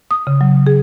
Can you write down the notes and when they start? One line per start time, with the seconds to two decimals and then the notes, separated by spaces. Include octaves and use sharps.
0.11 D#6
0.27 C#3
0.41 F#3
0.67 G#4